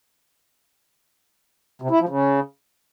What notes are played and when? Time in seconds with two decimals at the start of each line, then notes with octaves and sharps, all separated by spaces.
1.82 C3
1.91 E4
2.00 F3
2.09 C#3